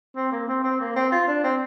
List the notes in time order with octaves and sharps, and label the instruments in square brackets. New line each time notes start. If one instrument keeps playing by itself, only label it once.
[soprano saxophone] C4
A#3
C4
C4
A#3
C4
F4
D4
C4